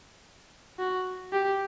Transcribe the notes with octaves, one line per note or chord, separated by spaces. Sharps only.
F#4
G4